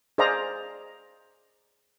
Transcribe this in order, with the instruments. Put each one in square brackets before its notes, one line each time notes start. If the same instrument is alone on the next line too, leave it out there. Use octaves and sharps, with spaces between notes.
[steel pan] G#4 C5 D5 D#5 F5 A#5